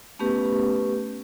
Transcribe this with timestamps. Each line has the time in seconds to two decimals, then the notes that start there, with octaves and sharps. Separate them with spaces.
0.19 A3 B3 C#4 G4 B4